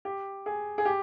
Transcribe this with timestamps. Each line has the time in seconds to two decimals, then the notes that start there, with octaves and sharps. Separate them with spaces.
0.05 G4
0.46 G#4
0.78 G#4
0.85 G4